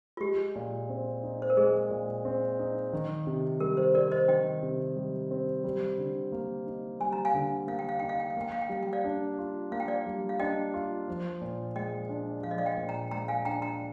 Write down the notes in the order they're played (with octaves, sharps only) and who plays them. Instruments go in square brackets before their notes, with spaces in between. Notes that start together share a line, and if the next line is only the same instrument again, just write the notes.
[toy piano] F4
[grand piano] G#3 [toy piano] G4
[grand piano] A#2
C4
D#4
[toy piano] C5
A#4
[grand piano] G#3 [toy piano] G#4
[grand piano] A#2
C4
D#4
D#3
C3
[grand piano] G3 [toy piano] A#4
[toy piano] C5
[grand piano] C4 [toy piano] A#4 D5
[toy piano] C5 D#5
[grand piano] D#3 [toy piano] D#5 G5
[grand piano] C3
G3
C4
G3
D3
A#3
D#4
[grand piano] G3 [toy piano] G#5
[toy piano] A#5
F5 G#5
[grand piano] D3
[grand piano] A#3 [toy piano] F5
[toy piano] G5
F5
[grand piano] D#4 [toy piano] G5
[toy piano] F5
G5
F5
[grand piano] A#3 [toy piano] G5
[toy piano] F5
G5
[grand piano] G3 [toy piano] F5
[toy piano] G5
D5 F5
[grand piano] D4
F4
[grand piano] A#3 [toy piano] F5
[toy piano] G5
D5 F5
[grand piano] G3
[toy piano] F5
[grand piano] D4 [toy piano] D#5 G5
[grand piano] F4
F3
A#2
[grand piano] G#3 [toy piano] D#5 G5
[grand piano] D4
[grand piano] F3 [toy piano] F5
[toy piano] D#5
D5 F5
D#5 G5
[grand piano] A#2
[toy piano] G5 A#5
[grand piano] G#3 [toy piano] G5 A#5
[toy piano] F5 G#5
[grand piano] D4 [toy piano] G5 A#5
[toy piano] G5 A#5